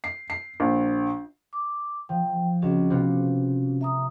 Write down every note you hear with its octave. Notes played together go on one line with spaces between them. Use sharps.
C7
C7
A#1
D6
F3 G5
C#2 C4 C#4 F#4
C3 B3 F4
E5 A#5 D#6